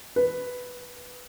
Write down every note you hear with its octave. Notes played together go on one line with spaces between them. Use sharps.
B4